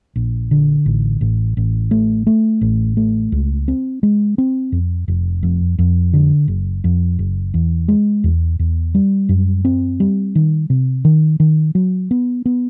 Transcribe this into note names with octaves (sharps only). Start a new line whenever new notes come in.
A#1
D3
A1
A1
A1
A3
A3
A1
A3
C#2
C4
G#3
C4
F2
F1
F2
F2
D3
F#1
F2
F#1
E2
G#3
E2
E2
G3
F#2
C4
G3
D#3
C3
D#3
D#3
F#3
B3
B3